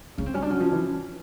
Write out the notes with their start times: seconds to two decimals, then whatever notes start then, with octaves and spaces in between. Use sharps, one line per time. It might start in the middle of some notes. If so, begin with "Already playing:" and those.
0.18 C#3 D#4
0.26 C4
0.34 G3 C#4
0.42 D4
0.50 F#3 C#4
0.60 F3
0.72 E3